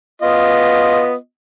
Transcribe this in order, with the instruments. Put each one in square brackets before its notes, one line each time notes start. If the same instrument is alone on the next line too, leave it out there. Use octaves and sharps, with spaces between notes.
[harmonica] B3 F4 D#5